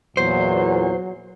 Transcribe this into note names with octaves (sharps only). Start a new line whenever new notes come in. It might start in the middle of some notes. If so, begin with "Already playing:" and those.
E2 A#2 F#3 C5